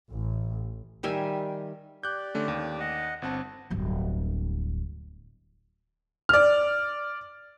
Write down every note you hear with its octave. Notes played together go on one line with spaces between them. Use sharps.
A1
D#3 G3 E5 G#5
G4 D5 F#6 G6
D3 A3 C#4
D#2
D#5 F#5
G1 C4 F#5 A5
D1 G1
D5 F6